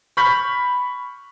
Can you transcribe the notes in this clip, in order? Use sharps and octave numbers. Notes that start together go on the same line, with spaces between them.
B5 C#6 F6 G6 B6